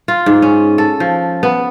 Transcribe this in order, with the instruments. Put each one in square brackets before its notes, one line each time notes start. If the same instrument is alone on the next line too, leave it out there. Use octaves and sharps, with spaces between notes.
[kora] F4
G#2
C#4
A4
F3
B3